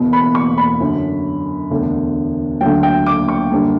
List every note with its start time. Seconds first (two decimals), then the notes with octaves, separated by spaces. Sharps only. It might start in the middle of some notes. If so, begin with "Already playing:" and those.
Already playing: E1 E2 B2
0.13 B5
0.35 C#6
0.58 B5
0.80 F#2 D3 F#3 C#4
1.70 E1 D2 D3
2.61 D2 D3 F#3 G5
2.83 G5
3.06 D6
3.28 C#6
3.51 F#2 D3 G3 A#3